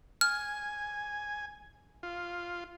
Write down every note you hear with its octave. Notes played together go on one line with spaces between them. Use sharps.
G#5 F6
F4